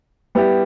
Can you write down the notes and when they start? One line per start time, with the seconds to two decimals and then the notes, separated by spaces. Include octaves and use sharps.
0.35 G3 B3 E4 G4